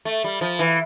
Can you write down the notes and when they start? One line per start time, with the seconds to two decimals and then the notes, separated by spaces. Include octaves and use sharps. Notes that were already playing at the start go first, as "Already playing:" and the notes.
0.05 A3
0.24 G3
0.41 F3
0.59 E3